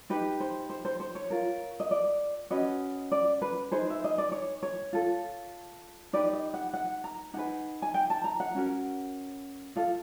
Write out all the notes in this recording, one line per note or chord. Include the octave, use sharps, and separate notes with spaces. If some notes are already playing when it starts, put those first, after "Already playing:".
D#4 G4 B4
C5
C5
C5
C5
C#5
F4 A#4
D#5
D5
C#4 F#4 B4 D#5
D5
B4
D#4 G#4 B4 C5
E5
D#5
D5
C#5
C#5
F4 A4
D#4 G4 B4 D5
D#5
F#5
F#5
A#5
D#4 G#4 B4 F#5
G#5
G5
A5
A#5
F#5
C#4 F#4 A#4
F4 A4 F5